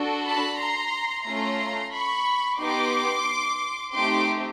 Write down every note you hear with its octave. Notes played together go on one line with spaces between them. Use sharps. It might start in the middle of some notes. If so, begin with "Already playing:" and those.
Already playing: D4 F#4 A4
A5 B5
A#5 C6
A3 C#4 F4 A4 A#5 C6
B5 C#6
B3 D#4 G4 C6 D6
A3 C4 D#4 G4 C6 D6